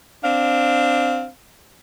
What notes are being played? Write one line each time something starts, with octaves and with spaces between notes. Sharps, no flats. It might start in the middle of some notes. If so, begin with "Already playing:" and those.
C4 D4 F5